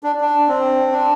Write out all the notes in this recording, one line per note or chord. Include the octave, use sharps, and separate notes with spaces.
D4
D4
C4
D4